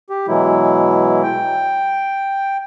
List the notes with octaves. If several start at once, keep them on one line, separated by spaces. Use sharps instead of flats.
G4
B2 E3 F#3 G#3 E4
G5